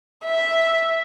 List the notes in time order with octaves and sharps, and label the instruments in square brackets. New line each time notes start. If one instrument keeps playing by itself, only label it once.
[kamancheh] E5